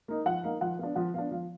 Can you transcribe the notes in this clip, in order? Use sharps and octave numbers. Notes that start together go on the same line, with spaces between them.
A#3 D#4
F3 F#5
A#3 D#4 F5
F3 F#5
B3 D4 F5
F3 F#5
B3 D4 F5
F3 F5